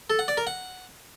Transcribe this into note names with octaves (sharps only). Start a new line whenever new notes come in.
A4
F#5
D5
A#4
F#5